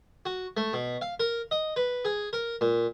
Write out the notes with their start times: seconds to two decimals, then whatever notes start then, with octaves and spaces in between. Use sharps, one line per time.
0.26 F#4
0.57 A3
0.73 B2
1.01 F5
1.20 A#4
1.51 D#5
1.76 B4
2.05 G#4
2.33 A#4
2.61 A#2